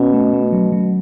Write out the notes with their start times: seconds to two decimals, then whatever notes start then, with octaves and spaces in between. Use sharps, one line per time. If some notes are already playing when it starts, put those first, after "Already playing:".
Already playing: B2 C#4
0.14 A3
0.34 A3
0.53 F#3
0.72 F#3